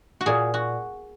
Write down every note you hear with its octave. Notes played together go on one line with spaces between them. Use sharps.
F#4
A#2 G#4
F#4